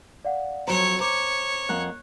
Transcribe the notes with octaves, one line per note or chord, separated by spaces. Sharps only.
D5 F5 F#5
F2 F#3 C5 C#5 A#5
C5 C#5 A#5 D6
F2 A#3 F#5 F#6